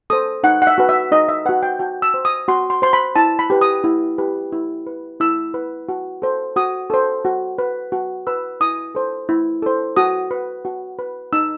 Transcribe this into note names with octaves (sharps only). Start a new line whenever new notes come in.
A4 C5 D#6
D#4 F#5
F#5
E5
F#4 B4
E5
D#4 D#5
E5
F#4 B4 F#5
G5
F#4 G5
E6
C5
D#6
F#4 C6
C6
C5 C6
B5
E4 A5
B5
G4 B4
D#6
E4
G4 B4
E4
B4
E4 E6
B4
F#4
A4 C5
F#4 D#6
A4 C5
F#4
B4
F#4
B4 E6
E4 D#6
A4 C5
E4
A4 C5
F#4 D#6
B4
F#4
B4
D#4 E6